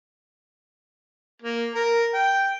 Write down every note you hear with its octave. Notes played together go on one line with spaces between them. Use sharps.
A#3
A#4
G5